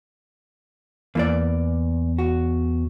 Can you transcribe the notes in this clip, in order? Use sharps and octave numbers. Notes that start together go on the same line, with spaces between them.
E2 A#3 E4 D5
F#4